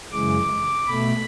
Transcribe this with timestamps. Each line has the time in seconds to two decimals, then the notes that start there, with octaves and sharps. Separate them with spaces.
0.12 F#2 C#3 E3 G#3 D6
0.86 B2 A3 B5